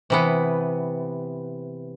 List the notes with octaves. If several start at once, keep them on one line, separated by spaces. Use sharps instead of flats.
C3 E3 B3